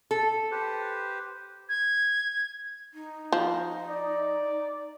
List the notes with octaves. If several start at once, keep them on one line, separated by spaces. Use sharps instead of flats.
A4
G4 B4 C5
G#6
D#4
F3
D5